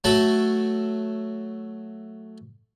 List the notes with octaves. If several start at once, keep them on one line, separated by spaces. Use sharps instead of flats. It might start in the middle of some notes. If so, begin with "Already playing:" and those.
F#3 A3 A4 E5 F#5